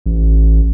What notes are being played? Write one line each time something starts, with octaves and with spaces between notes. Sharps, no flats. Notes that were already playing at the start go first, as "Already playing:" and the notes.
A1